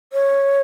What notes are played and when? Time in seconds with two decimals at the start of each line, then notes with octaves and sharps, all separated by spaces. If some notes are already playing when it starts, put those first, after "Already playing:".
0.13 C#5